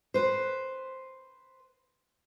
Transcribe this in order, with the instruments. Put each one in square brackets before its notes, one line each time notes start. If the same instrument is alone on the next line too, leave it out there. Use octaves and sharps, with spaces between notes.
[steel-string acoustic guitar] B4 C5